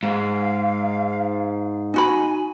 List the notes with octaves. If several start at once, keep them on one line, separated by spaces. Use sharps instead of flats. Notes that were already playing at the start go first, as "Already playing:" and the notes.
G#2 F5
D#4 F#4 G#5 B5